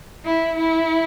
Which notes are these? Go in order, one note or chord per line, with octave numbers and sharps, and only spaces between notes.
E4
E4